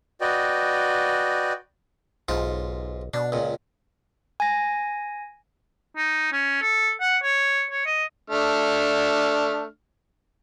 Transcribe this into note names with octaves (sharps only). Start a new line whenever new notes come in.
F#4 B4 D5 D#5 G5
B1 G#2 F4
B2 D4
C#2 A#2
G#5 A#6
D#4
C#4
A4
F#5
C#5
C#5
D#5
A3 D4 F6